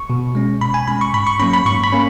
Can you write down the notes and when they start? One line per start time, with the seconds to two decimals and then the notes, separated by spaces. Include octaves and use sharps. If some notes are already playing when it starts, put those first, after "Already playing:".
Already playing: C#6
0.10 B2
0.35 G#3 C#4
0.61 B2 B5
0.74 G#5
0.88 G#3 C#4 B5
1.01 C#6
1.14 G#2 B5
1.27 C#6
1.40 F#3 A#3 C#4 B5
1.53 B5
1.66 G#2 C#6
1.84 B5
1.92 A#3 C#4